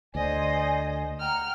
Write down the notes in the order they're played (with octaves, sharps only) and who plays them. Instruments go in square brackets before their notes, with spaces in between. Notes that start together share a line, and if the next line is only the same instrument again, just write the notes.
[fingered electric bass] D2 [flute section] C5 D5 G#5 [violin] D#5
[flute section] F#5 A#5 [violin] G5 F6